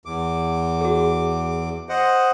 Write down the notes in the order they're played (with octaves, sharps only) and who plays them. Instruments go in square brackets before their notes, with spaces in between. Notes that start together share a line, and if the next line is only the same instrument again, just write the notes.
[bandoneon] E2 D6
[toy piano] F#4 G#4
[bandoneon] C5 D#5 F#5